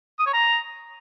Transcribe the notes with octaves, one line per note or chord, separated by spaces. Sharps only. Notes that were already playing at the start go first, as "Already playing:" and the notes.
D#6
C#5
A#5